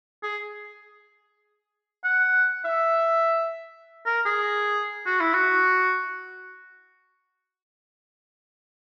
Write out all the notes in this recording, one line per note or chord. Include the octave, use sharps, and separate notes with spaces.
G#4
F#5
E5
A#4
G#4
F#4
E4
F#4